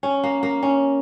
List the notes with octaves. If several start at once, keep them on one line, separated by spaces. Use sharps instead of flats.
C#4
A#3
A#3
C#4